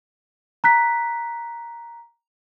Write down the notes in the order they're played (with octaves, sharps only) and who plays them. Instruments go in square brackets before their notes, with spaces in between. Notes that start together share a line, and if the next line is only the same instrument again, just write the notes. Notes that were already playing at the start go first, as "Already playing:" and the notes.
[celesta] A#5 F#6 B6